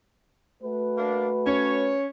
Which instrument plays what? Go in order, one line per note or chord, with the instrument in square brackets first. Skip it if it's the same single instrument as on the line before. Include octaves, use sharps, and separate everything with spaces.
[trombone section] A3 F#4 B4
[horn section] A#3 D4
[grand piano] C#4 [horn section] C#5